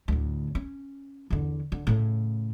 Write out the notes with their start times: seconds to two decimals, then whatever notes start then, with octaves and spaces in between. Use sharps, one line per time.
0.08 D2 A2
0.55 C#4
1.30 E2 D3
1.72 D3
1.87 A2 C#3